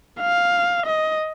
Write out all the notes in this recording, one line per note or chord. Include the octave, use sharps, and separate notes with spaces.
F5
D#5